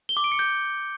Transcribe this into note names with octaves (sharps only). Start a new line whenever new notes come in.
G7
D6
D7
C#7
G6